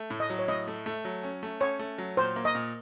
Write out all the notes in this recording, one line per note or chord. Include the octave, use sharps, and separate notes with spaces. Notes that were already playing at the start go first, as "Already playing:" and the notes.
Already playing: A3
A2
D#5
F#3
C#5
A2 D#5
A3
A3
F#3
C#4
A3
C#4 C#5
A3
F#3
A#2 C5
A#3
D#5
A#2